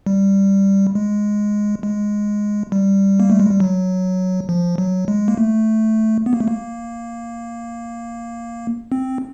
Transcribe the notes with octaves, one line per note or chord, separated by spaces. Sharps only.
G3
G#3
G#3
G3
A#3
A3
G#3
G3
F#3
F3
F#3
G#3
A#3
A3
B3
A#3
A3
A#3
C4